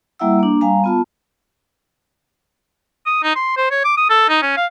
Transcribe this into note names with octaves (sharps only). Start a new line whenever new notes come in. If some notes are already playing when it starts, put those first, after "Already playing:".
G3 A#3 E4 E5 F#5 E6
A#3 D4
G3 F5 G#5 A#5
B3 F4 A5
D#6
D#4
C6
C5
C#5
D6
D#6
A4
D#4
C#4
F5